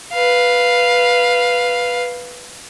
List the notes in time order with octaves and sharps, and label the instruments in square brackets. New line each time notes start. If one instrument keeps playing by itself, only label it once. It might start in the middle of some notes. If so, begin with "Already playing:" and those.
[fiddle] B4 F5